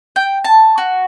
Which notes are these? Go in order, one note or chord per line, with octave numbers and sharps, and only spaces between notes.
G5
A5
F#4